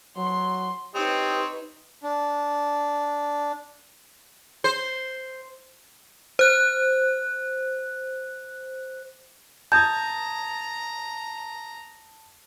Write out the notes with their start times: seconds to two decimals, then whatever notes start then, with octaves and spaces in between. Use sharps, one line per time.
0.17 F#3 C6
0.95 C4 D#4 G4 B4 C#5 D#5
2.03 D4
4.64 C5
6.39 C5 F#6
9.72 A5 A#5 D#6 G6 G#6